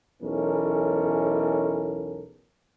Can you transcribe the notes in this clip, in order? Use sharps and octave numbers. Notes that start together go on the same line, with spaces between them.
B1 E2 E3 C#4 A4 A#4